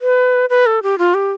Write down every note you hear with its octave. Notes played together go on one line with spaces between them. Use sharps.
B4
B4
A4
G4
F4
G4